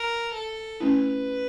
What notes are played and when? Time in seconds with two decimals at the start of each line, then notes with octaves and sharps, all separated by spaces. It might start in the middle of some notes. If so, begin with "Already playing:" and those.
Already playing: A#4
0.34 A4
0.80 A3 C#4 E4 B4